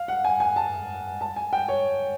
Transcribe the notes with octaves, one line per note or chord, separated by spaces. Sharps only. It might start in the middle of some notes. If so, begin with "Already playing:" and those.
Already playing: F5
F#5
G#5
G#5
A5
A5
G#5
G5
C#5